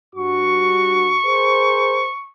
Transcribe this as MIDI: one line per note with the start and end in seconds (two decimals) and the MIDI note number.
0.15 1.18 43
0.15 1.18 66
0.15 2.30 85
1.24 2.07 68
1.24 2.07 70
1.24 2.07 72